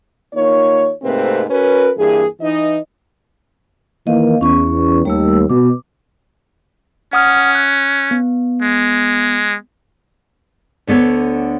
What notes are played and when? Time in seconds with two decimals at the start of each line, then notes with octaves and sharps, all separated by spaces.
0.34 D#3 A#3 D#4 F4 C#5
1.02 G#2 C3 A3 A#3 C4 B4
1.49 C#4 F#4 A#4 B4
1.97 G2 E3 A#3 G#4
2.41 E3 D#4 D#5
4.07 D#3 E3 A#3 D#5 F5
4.41 E2 C#4 C#6
5.05 D#2 G3 A3 E6
5.50 B2 D6
7.13 C#4 F#5 D#6 F6
7.55 F#6
8.11 B3
8.62 G#3
10.87 D2 D3 B3 A4 C#5